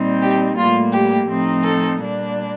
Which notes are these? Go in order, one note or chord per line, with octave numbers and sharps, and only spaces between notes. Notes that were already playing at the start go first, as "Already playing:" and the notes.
Already playing: A#2 G3 C4 D#4
G4
A2 G3 A#3 F4
G4
A2 F3 C4 D#4
A4
A#2 G3 A#3 D4